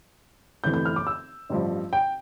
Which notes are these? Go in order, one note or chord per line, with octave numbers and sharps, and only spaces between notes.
G1 F2 E3 A3 G6
G6
F6
D6
E6
A1 G2 F3
G5